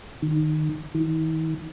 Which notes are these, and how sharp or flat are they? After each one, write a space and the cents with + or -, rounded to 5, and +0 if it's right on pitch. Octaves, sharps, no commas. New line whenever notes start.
D#3 -15
D#3 +45